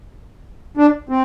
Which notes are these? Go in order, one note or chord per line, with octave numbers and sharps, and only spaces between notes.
D4
C4